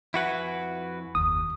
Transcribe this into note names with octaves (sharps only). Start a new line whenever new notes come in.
F2 E4 F#4 B4 F#5 G#5
F#1 D#2 D#6